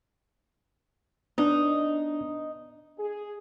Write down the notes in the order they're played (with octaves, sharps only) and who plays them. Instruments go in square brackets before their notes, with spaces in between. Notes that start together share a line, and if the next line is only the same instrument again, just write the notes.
[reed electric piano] B3 D4 [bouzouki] D#4
[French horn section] G#4